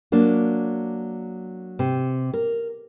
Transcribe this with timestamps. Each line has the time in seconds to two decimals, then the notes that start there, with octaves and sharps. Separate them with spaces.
0.12 F#3 A#3 D4
1.79 C3
2.34 A#4